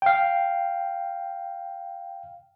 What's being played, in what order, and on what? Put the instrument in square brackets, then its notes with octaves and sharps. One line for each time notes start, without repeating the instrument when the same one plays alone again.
[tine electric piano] F5 G5